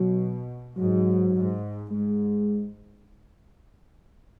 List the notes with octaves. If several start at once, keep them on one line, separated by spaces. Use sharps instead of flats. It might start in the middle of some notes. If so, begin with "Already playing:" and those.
Already playing: B2 F#3
G#2 F#3
G#2
G#2 G#3